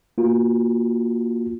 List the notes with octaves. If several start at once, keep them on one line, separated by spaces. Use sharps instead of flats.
A#3 F4 F#4